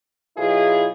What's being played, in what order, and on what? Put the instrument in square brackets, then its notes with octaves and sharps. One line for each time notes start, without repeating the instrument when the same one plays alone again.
[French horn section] B2 F#3 E4 F4 G#4